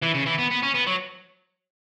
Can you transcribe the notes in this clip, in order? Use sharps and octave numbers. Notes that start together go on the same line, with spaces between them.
E3
C#3
E3
B3
B3
C#4
B3
F#3